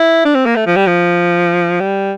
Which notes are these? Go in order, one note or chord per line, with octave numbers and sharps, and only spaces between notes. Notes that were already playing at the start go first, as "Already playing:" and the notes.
Already playing: E4
D4
C4
A#3
A3
F3
G3
F3
G3